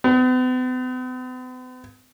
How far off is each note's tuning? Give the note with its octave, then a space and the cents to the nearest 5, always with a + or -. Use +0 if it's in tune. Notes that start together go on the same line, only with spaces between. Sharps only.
B3 +45